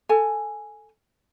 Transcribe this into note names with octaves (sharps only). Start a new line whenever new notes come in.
A4 G#5